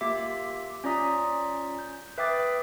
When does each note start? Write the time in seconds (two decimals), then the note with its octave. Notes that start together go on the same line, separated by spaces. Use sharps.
0.01 A#3 F4 G4 E5 D6
0.84 C#4 F4 D5 A#5 D#6 B6
1.79 G6
2.18 B4 E5 G5 D6 D#6 A6